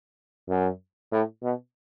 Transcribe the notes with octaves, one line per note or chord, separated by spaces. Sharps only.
F#2
A2
B2